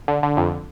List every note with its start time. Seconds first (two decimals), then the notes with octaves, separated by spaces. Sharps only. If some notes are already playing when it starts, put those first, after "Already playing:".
0.08 D3
0.23 D3
0.37 F2